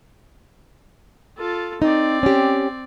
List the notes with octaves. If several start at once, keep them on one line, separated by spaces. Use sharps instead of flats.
F4 A4
C4 D#4 D5
C#4 G4